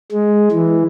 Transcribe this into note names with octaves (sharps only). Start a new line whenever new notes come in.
G#3
E3